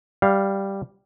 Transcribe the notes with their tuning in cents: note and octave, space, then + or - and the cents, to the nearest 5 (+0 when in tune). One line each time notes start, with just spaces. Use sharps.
G3 +0 F5 +0